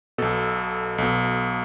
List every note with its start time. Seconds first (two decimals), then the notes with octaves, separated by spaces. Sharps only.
0.18 B1 B2 A4
0.98 B1 B2